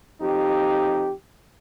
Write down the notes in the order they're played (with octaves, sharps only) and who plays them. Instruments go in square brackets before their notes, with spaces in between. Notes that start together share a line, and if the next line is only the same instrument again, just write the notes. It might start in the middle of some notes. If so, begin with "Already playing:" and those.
[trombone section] F2 D#4 G4